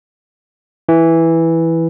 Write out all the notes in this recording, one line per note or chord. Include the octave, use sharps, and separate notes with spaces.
E3